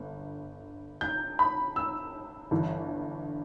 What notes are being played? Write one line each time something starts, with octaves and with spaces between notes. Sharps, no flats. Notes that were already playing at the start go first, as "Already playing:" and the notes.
Already playing: G1 G2
G6
B5
E6
G1 G2 E3